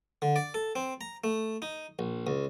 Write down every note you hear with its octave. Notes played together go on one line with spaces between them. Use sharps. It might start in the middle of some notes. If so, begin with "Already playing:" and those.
D3
D5
A4
C4
A#5
A3
D#4
A#1
C#2